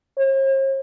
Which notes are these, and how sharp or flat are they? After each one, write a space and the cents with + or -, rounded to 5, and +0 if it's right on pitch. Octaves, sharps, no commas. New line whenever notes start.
C#5 -45